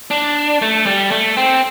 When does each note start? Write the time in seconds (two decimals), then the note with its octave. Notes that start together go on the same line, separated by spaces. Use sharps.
0.11 D4
0.62 A3
0.86 G3
1.11 A3
1.37 C4